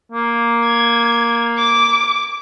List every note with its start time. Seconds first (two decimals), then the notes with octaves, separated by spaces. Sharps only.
0.12 A#3
0.65 G#6
1.58 D6